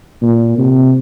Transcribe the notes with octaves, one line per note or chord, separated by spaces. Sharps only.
A#2
C3